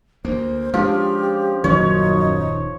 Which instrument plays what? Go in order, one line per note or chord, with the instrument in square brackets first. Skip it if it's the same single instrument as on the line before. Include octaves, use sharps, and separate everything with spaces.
[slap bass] D2 A#3 [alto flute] C5
[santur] F3 [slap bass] G#3 C#4 D4 [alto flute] G4
[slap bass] D#1 D#3 [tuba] F#2 [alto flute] D#4 [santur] C#5